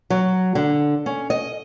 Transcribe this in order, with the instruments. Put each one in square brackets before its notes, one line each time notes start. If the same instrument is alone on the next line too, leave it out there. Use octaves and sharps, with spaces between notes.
[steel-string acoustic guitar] F#3
D3
C#4
D#5